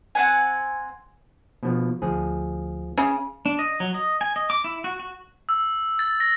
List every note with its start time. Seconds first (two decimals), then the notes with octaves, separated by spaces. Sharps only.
0.15 C4 F#5 G#5
1.63 B2 F3
2.02 D2 F3 G#4
2.98 C#3 C#4
3.46 D4
3.59 D#5
3.80 F#3
3.94 D#5
4.21 G#5
4.36 D#5
4.50 D6
4.64 E4
4.84 F#4
5.00 F#4
5.49 E6
5.99 A6
6.20 A#6